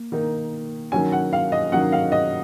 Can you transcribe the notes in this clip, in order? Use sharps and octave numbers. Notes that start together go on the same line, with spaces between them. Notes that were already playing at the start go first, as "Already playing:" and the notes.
Already playing: A#3
D#3 A#3 D#4
D#3 F#3 C#4 G#5
F#5
F5
D#5
D#3 F#3 C#4 F#5
F5
D#5